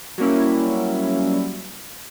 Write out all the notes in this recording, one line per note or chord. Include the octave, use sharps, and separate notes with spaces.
F#3 G3 A#3 C#4 E4